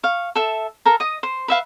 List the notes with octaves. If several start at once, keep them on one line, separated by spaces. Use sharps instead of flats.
F5 C#6
A4 E5
A4 A#4 A#5
D#5 D#6
C5
B4 E5 F5